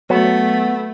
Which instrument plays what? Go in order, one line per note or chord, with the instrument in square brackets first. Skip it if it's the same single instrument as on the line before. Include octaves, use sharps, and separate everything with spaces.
[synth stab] F#3 [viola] A3 [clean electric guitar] B3